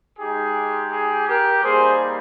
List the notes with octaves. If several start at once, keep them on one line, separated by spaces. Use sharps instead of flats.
G#3 D#4 G4 G#4
G#4
G4 A#4
G3 A#3 D#4 G4 G#4 C5